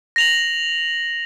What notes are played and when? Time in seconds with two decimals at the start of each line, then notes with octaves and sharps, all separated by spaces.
0.16 A#6 F7 F#7